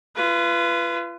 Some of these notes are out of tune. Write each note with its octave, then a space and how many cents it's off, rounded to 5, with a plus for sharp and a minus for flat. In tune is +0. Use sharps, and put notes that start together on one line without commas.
F4 -35 B4 +0